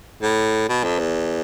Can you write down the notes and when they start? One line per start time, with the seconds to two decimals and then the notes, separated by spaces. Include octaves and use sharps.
0.23 A2
0.69 B2
0.84 F2
0.99 E2